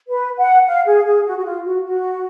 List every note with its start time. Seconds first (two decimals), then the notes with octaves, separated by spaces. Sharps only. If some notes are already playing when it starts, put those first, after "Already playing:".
0.09 B4
0.38 F#5
0.67 F5
0.87 G#4
1.06 G#4
1.25 F#4
1.38 F#4
1.45 F4
1.65 F#4
1.85 F#4